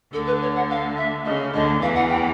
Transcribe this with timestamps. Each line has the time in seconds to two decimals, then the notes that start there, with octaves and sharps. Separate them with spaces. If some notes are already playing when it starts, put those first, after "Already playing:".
0.13 D2 D3 A4
0.27 B4
0.41 C#5
0.55 F#5
0.70 F5
0.97 E5
1.25 C#3 D#5
1.53 D2 D3 D#5
1.81 E2 E3 F5
1.95 F#5
2.10 G5